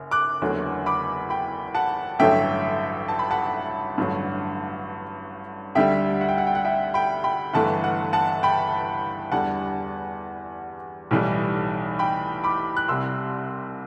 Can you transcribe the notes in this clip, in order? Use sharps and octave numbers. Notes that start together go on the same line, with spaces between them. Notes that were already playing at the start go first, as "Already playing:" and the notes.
Already playing: F#1 F#2
D6 F#6
F#1 E2 D3 F#3 A3
B5 D6
G5 B5
F#5 A5
A1 G2 D3 F#3 A3 E5 G5
A5
B5
F#5 A5
A1 G2 D3 F#3 A3
D2 D3 G3 E5 G5
F#5
G5
F#5
G5
F#5
E5 G5
G5 B5
G5 B5
G1 G2 E3 A3 F#5 A5
F#5
F#5 A5
G5 B5
E2 D3 G3 F#5 A5
B1 A2 E3 G3
G5 B5
B5 D6
F#6
C2 C3 G3 C6 E6